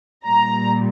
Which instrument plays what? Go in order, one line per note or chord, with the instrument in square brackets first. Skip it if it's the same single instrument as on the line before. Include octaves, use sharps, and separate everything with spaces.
[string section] A#2 G3 A#5